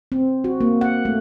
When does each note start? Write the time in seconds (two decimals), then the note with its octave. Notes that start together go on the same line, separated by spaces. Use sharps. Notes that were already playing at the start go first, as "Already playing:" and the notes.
0.12 C4
0.44 F#4
0.60 A#3
0.81 F#5
1.05 A3